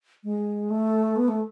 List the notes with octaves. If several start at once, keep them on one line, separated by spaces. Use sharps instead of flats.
G#3
A3
B3
A3